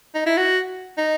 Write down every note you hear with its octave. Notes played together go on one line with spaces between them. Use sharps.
D#4
E4
F#4
D#4